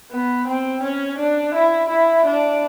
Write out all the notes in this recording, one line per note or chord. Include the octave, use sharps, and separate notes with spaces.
B3
C4
C#4
D4
E4
E4
D4